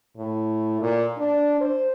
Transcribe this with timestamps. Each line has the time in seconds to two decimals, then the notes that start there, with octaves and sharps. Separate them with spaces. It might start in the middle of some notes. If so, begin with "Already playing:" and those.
0.17 A2
0.81 A#2
1.17 D4
1.60 C5